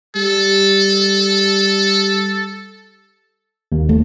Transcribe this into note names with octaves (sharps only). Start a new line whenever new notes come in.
G3 A4
D#2
A3